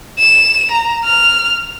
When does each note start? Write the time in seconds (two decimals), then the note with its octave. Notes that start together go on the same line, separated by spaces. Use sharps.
0.19 E7
0.71 A#5
1.04 F6